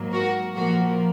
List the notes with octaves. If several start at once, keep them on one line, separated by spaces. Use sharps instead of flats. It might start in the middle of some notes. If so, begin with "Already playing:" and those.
Already playing: G#2 F#3 A#3
F#4 A#4
A#2 F3 A#3 F#4 A#4